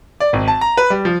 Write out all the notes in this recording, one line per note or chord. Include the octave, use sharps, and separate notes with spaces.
D5
G#1
A5
A#5
B4
G3
F3